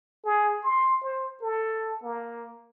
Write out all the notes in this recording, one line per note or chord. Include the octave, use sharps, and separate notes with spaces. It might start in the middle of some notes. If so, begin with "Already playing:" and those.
G#4
C6
C5
A4
A#3